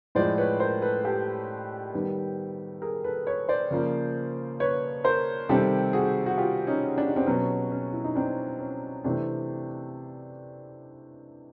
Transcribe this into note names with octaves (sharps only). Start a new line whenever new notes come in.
A2 F3 G#3 C5 D5
B4 C#5
A#4 C5
A4 B4
G4 A4
D#3 G3 B3
G#4 A#4
A4 B4
B4 C#5
C5 D5
C#3 F3 A#3
B4 C#5
A#4 C5
C3 D#3 G3 C4 G4 A4
F#4 G#4
F#4
F4 G4
C#4 D#4
D4
D#4
C4 D4
B2 F#3 B3 C#4
C#4
E4
D#4
C4 D4
C#4
C3 E3 A3 C4 D4